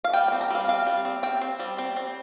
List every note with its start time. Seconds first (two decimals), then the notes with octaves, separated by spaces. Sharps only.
0.04 F5
0.13 G3 G5
0.28 G5
0.32 C4
0.41 A#5
0.50 G3 F5
0.69 C4 F5
0.86 G3
1.05 C4
1.23 C4 G5
1.41 C4
1.59 G3
1.78 C4
1.96 C4